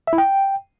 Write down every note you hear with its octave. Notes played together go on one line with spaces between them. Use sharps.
E5
E4
G5